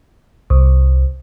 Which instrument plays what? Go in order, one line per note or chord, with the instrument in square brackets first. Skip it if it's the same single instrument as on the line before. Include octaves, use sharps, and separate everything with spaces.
[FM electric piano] C2